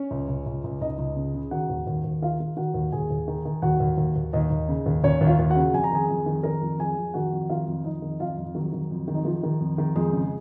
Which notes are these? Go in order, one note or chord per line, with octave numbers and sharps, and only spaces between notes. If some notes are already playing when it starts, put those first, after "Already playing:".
Already playing: C#4 C#5
C#2
C#2
C#2
C#2
C#2 D#4 D#5
C#2
C#3
C#3
D#3 F#4 F#5
D#2
D#2
D#2
D#3 F4 F5
D#3
D#3 F#4 F#5
D#2
D#2 G#4 G#5
D#2
D#3
D#3
D#2 F#4 F#5
D#2
D#2
D#2
D#2 D#4 D#5
D#2
C#3
D#2
D#2 C#4 C#5
D#2
F4 F5
D#2
F#4 F#5
C#3
F2 G#5
A#5
D#3 G#4 G#5
F2
D#3
D#3 A#4 A#5
F2
F2 G#4 G#5
F2
D#3 F#4 F#5
F2
D#3 F4 F5
F2
F2 D#4 D#5
D#3
F2 F4 F5
F2
D#3 F#3 F#4
D#3
F2
D#3
D#4
D#3 F3 F4
D#3
F2
D#3
F2 G#3 G#4
C#3